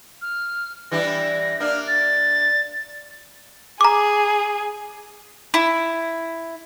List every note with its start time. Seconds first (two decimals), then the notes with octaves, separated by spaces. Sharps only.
0.22 F6
0.92 E3 G3 D4 A#6
1.60 A#3 D4 F6
1.87 A6
3.81 G#4 A#5 D6
5.54 E4